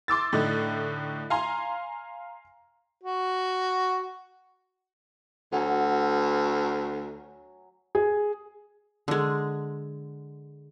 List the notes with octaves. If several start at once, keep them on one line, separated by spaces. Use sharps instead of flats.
C6 D6 E6 A6
A2 D3 D#4
F5 G#5 A#5 C6
F#4
D2 F#3 G#5
G#4
D3 G#3